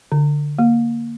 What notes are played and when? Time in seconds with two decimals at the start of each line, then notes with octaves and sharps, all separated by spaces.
0.12 D3
0.59 A#3